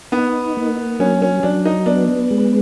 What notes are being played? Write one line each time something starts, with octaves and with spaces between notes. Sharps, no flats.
B3 D#4
A#3
F#3 C#4
C#4
F#3 D4
D#4
B3 D4
G#3